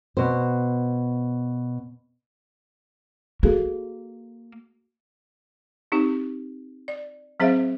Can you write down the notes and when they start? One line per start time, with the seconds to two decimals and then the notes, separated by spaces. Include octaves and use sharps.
0.17 B2 C5
3.43 A#3 F#4 G#4 A4
5.92 C4 D#4 G4
6.88 D5
7.40 F#3 C4 G#4 C5 E5 F5